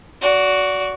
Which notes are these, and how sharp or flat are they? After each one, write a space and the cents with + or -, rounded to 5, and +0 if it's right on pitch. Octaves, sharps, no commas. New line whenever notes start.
F#4 +0 D5 -30